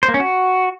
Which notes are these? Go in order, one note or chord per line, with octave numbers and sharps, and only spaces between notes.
C5
A#3
C#4
F#4